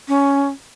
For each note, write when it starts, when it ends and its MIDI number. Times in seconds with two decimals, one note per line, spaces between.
0.08 0.48 61